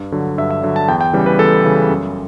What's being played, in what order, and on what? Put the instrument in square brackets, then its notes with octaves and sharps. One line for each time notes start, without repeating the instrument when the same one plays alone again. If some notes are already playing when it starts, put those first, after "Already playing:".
Already playing: [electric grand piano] G2
D3 F#3
G2 E5
E5
D3 F#3
A5
E2 G5
G5
C#3 E3 G3
B4
E2 A4
C#3 E3 G3
F#2